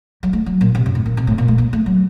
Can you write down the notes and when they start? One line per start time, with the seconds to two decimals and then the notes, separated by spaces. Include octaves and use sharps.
0.23 F#3
0.33 A3
0.46 F#3
0.61 A#2
0.75 C3
0.86 F#2
0.95 A2
1.06 A#2
1.17 C3
1.27 A2
1.38 A#2
1.48 A3
1.58 A#3
1.73 A3
1.86 F#3